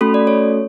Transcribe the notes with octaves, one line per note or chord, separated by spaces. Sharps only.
A3 C#4 F#4 A4 B5
D5
C#5